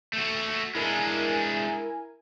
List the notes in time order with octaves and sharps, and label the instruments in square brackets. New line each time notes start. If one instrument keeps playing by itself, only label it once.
[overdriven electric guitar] A3 F#4
[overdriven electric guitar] G#3 D4 [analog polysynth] E4 A#4 G#5